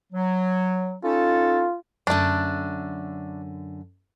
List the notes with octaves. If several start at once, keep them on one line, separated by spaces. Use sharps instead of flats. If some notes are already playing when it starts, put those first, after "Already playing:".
F#3
C#4 D#4 F4 A4
F#2 D3 A3 D4